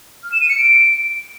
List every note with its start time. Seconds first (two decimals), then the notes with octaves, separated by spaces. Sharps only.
0.24 F6
0.32 E7
0.41 D#7
0.49 C#7
0.58 D7